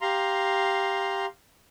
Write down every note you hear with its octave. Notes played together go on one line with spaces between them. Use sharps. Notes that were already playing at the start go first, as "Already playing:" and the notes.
G4 F5 A#5 C6